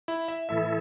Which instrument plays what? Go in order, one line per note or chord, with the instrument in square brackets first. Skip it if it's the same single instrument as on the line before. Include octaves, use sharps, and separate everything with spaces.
[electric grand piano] E4
E5
[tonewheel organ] A2 E3 A3 E4 A4 [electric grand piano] E5